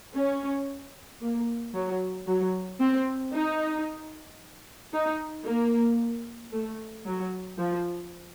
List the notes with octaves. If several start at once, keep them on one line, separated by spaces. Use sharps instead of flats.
C#4
A#3
F#3
F#3
C4
D#4
D#4
A#3
A3
F#3
F3